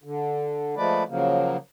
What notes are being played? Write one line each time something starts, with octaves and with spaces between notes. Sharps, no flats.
D3
F3 G#3 A3 B4 D5
C#3 F3 F#3 A#3